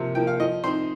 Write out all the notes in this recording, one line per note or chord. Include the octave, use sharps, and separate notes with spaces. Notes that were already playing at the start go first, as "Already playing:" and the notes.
Already playing: C3 F3 A#3
F3 A#3 G5
F5
F3 D#5
C4 D#4 C5